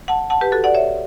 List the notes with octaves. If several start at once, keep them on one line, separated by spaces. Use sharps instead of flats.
F#5 A5
F#5 A5
G4 B4
F#4 A4
D5 F#5
C#5 E5